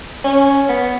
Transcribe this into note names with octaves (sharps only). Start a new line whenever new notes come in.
C#4
B3